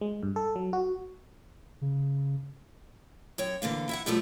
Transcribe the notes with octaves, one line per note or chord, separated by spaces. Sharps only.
G#3
G2
A4
F#3
F#4
C#3
F#2 C#5 G5
D3 E3 A#3 F5
E4 E5 F#5
F#2 B2 F3 G3 A3 A5